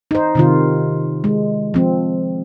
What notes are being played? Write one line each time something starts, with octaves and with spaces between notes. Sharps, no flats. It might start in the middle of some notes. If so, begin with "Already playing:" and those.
D#4 C5
C3 D#3 F4
G#3
F3 C4